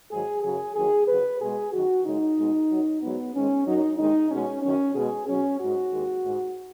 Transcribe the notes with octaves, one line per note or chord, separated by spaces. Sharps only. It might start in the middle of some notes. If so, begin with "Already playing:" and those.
G#2 D#3 F#3 G#4
F#2 C#3 F#3 G#4
D#2 D#3 F#3 G#4
F#2 C#3 F#3 B4
B2 G#3 G#4
F#2 D#3 F#3 F#4
F#2 C#3 G#3 D#4
B2 G#3
F#2 F#3
G#2 F#3 B3
G#2 D#3 G#3 C#4
F#2 F#3 D#4
D#2 D#3 G#3 D#4
B2 G#3 C#4
F#2 D#3 F#3 C#4
B2 G#3 G#4
B2 F#3 C#4
G#2 F#3 F#4
D#2 D#3 G#3
G#2 G#3